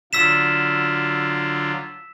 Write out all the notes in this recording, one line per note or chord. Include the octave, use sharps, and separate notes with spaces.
D3 F#3 F4 E6 B6 E7